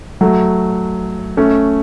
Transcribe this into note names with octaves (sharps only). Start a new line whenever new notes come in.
F#3 A3
A3 C#4